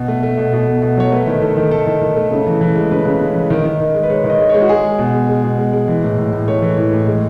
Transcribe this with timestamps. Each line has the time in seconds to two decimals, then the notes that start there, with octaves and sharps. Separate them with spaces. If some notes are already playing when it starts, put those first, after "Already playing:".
Already playing: B2
0.08 A3
0.23 A3
0.37 B2
0.53 B2
0.68 A3
0.82 B2
0.97 F#3 C#5
1.12 A3 B4
1.27 D#3
1.42 D#3 A4
1.57 D#3
1.71 A3 A4
1.87 D#3
2.01 D#3
2.16 A3
2.31 C#3
2.47 E3
2.61 E3
2.75 G#3
2.91 C#3 B4
3.05 C#3
3.21 C#3
3.35 E3
3.50 D#3
3.65 D#3
3.80 D#3
3.95 G#3
4.03 B4
4.10 G#3 C#5
4.24 D#3
4.30 D#5
4.39 G#3
4.49 G#3 C#5
4.62 F#4
4.69 G#3 G#4
4.84 G#3
4.99 B2
5.14 G#3
5.29 G#3
5.43 B2
5.59 G#3
5.73 G#3
5.88 E3
6.03 A2
6.18 A2
6.33 A2
6.48 A3 C#5
6.62 E3
6.77 A2
6.93 A2
7.07 G#3